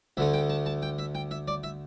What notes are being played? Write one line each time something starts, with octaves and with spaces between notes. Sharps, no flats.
D2 D3 A3 E5
G5
A5
A5
G5
E5
G5
E5
D5
E5